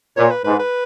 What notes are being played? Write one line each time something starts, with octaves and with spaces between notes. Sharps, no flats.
A#2 C#5
B4
G#2 B4
B4